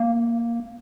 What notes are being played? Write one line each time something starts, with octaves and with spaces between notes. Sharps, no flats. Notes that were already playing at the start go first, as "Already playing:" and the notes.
Already playing: A#3